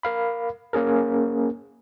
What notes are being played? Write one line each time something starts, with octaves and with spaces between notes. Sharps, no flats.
A#4 F5 B5
A#3 C#4 G#4 A#4